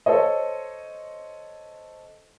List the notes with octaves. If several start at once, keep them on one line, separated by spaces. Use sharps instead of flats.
A4 C5 C#5 D#5